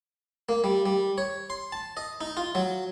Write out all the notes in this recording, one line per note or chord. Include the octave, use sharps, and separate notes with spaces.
A#3
G3
G3
C#5
C6
A5
D#5
D#4
F4
F#3